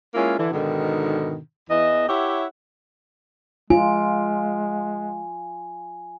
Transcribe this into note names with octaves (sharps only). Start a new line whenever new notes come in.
G#3 A#3 C#4 E4 F4
D3 E3
G#2 B2 D3 D#3
E2 E3 D#5
E4 G4 C#5 E5 F#5
G#3 F4 G#5